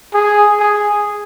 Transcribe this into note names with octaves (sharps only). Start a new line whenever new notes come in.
G#4
G#4